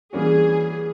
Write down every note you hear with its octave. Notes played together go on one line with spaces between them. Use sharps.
E3 G3 A#3 C#4 F#4 G#4